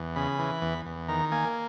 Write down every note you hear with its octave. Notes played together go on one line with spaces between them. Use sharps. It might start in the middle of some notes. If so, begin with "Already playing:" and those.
Already playing: E2
C#3 B5
E3
E2
E2
D#3 A#5
A#3 G#5